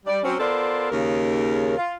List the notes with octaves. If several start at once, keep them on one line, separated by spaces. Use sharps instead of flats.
G3 D5
F#3 C4 C#4
B3 F4 A4 A#4 C5 D5
D#2 C#3 A#4
F4